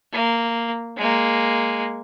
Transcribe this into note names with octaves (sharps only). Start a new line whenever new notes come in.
A#3
G#3 A#3